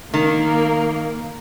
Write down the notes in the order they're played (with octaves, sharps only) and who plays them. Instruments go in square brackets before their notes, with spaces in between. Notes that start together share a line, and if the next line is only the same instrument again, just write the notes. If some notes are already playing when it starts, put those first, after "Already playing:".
[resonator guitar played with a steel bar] D#3 [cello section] A#3